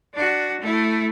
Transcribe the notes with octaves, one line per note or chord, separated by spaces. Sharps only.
D4 F#4
A3 E4